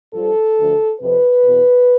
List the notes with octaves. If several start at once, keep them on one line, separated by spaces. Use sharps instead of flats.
G2 F3 A4
D2 D3 F3
F2 C3 F3 B4
E2 B2